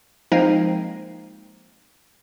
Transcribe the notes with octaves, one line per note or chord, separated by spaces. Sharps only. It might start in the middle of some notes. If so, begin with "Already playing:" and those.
F3 G#3 A#3 C4 D#4